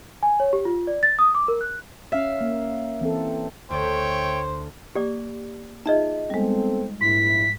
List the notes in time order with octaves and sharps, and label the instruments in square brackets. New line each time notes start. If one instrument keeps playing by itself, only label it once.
[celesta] G#5
C#5
G4
F4
D5
A6
D#6
D6
A#4
F#6
[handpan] C#4 F5 [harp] E5
[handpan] A#3
E3 C4 A4
[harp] D2 [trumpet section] A3 C#5 G5 [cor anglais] C5
[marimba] A#3 [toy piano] G4 D5 D6
[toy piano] D#4 D#5 [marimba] F4 G#4 E5
[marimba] G3 G#3 [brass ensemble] B3 C4 A4
[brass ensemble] A#1 E4 [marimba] G#2 [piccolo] B6